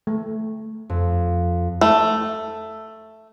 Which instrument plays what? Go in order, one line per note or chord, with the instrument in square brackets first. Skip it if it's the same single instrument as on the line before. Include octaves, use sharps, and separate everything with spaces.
[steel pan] A3
[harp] F2
[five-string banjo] A3